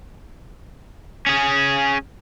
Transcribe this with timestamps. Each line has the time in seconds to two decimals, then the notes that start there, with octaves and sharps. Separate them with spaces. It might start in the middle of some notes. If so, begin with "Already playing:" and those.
1.26 C#4 G#4